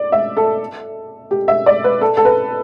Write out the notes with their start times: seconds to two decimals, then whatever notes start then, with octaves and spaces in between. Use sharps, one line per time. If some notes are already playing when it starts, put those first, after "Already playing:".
Already playing: D5
0.12 E5
0.37 A4
1.31 G4
1.48 E5
1.66 D5
1.84 B4
2.01 A4
2.17 A4
2.25 B4